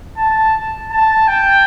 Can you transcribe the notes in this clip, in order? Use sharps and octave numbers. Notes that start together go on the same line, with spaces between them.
A5
A5
G5